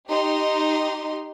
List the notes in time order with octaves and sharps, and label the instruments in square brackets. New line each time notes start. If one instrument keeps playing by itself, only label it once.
[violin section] D#4 G4 C6